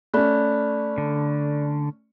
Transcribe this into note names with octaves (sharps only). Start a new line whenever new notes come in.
A3 C#4 D5 B5 F#6
D3